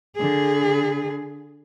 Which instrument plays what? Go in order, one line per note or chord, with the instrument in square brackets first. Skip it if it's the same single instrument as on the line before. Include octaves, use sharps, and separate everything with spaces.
[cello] D3 G#4